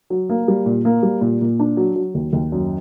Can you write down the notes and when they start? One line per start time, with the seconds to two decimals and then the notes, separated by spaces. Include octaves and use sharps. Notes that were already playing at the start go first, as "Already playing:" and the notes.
0.10 F#3
0.30 A#3
0.48 G3
0.66 A#2
0.85 A#3
1.03 G3
1.21 A#2
1.41 A#2
1.60 D4
1.77 F#3
1.96 F#3
2.14 D#2
2.33 D#2
2.52 F#2